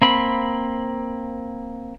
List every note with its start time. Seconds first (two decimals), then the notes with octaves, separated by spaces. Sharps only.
0.02 A#3 C4 B5